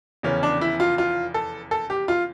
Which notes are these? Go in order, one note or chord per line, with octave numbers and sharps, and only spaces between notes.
F1 E2 C#3 C#4
D4
E4
F4
F4
A4
A4
G4
F4